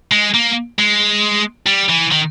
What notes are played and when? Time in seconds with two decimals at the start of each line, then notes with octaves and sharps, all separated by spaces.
0.12 G#3
0.34 A#3
0.79 G#3
1.66 G3
1.89 E3
2.11 D#3